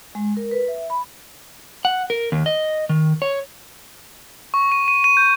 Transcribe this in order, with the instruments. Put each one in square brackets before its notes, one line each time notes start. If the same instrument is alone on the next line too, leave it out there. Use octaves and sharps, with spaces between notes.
[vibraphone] G#3
A#4
B4
E5
B5
[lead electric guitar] F#5
A#4
D#2
D#5
D#3
C#5
[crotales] C#6
D#7
D#7
D#7
G6